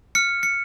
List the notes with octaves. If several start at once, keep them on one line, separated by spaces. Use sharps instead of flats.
F6 C#7
C#7